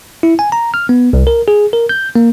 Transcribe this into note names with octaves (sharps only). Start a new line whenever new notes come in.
E4
G#5
A#5
F6
B3
C2
A#4
G#4
A#4
G6
A#3